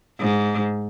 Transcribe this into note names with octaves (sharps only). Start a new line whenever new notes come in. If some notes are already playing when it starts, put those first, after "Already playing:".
G#2